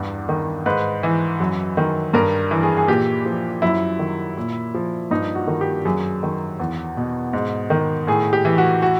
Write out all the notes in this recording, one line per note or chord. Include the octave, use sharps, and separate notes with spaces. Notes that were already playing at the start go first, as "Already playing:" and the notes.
Already playing: E2 G2
D#3
G#2 B4
E3
F#2
D#3
G2 A#4
E3
G#4
G#4
A#2 G4
F3
F#2 E4
D#3
A#2
F3
G2 D#4
F#4
D#3
G4
F#2 G#4
D#3
E2
B2
G#2
D#3
A2 G#4
G4
E3
F#4
F#4